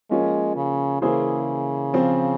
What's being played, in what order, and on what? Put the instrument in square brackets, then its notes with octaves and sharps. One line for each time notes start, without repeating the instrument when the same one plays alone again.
[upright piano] F3 A#3 C#4 F4 [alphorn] G#3
[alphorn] C#3
[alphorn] C#3 [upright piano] E3 A#3 E4 G#4 C5
[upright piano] F3 C4 F4 C5